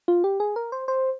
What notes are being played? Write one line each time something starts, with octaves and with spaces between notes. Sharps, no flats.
F4
G4
G#4
A#4
C5
C5